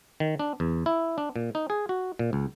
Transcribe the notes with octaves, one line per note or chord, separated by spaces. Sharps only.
D#3
D4
E2
E4
D4
A#2
D#4
G#4
F#4
A#2
C#2